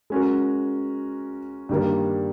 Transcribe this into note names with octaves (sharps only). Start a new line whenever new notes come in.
G#3 C#4 F#4 A#4
G2 D#3 G3 A#3